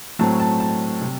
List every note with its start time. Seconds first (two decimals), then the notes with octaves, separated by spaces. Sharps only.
0.19 A2 F#3 A3 C4 A5
0.40 A5
0.60 A5
1.01 C3 G3